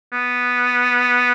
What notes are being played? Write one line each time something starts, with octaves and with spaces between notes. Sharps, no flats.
B3